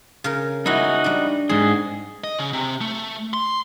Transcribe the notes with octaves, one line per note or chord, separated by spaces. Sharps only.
C#3 A#4
G#3 D#4 E4 F#4
G3 D4
G#2 C4 G#4
D#5
C#3
C3
A3
C6